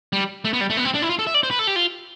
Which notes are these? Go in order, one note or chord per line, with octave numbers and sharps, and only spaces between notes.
G3
A3
B3
G3
A3
B3
C4
D4
E4
F4
A4
E5
D5
C5
B4
A4
G4
F4